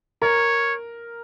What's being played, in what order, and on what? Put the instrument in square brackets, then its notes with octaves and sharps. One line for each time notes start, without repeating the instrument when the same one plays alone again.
[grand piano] A#4 [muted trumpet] C#5